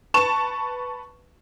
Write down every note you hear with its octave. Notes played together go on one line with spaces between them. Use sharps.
B4 A5 C#6 E7